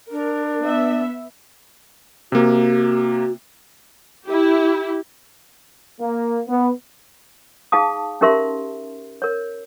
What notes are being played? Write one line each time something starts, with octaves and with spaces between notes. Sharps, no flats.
D4 A#4
B3 E5
C3 A#3 F#4
E4 G4
A#3
B3
D#4 G#4 F5 A5 D#6
C#4 D#4 G4 A#4 E5 C6
A#4 C#5